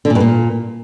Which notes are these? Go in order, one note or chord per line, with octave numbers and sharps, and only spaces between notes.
D3
A#2
G2
A#2